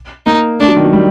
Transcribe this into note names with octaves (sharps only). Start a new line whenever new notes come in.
A#3 D#4
A3 D4
F#3
D#3
F#3
G3